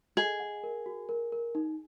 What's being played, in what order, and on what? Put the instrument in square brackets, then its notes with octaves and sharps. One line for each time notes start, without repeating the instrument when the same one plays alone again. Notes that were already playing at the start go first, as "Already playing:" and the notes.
[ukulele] G#4 [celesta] D#5
[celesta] F#5
A#4
F#4
A#4
A#4
D#4